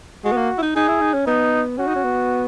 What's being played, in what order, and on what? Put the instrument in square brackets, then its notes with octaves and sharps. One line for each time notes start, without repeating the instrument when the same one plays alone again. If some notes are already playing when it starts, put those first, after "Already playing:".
[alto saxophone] G#3 [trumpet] F#4
[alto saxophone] B3
A#3
E4
D#4
[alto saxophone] D#4 [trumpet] G#4
[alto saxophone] E4
D#4
C#4
[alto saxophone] B3 [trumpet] D#4
[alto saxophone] C#4 [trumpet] F#4
[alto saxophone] D#4
C#4
B3